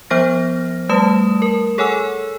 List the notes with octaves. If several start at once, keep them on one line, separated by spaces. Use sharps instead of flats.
F3 B3 C5 F6 A#6
G3 A3 B4 A5 D#6 E7
A#4
G#4 A4 C#5 F#5 G#5 E6